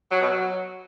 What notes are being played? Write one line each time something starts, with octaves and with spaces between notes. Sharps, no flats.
F#3
B2
F#3